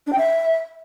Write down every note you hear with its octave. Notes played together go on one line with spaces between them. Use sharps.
D4
G5
E5